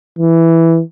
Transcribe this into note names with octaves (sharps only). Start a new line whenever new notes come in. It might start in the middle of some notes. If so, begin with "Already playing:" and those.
E3